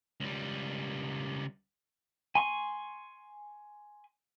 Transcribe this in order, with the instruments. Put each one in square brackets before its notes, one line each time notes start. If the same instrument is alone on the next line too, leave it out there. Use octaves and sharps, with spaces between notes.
[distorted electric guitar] C#2 G3
[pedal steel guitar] G#5 C6 C#6